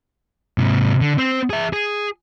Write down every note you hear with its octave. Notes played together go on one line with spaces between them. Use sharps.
G#2 C3
D3
C4 C5
G#4 E5
G#4